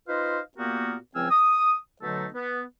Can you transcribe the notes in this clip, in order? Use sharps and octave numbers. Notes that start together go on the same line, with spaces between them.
D#4 F4 B4 C5 D#5 F5
A#2 A#3 B3 F#4 G4 A#4
C#2 F3 C4 G#5 E6 F6
D#6
B2 D3 F#3 A3 D#4 A4
B3